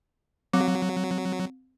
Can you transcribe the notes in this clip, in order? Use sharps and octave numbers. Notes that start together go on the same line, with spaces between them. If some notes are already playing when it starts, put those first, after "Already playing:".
F#3 C4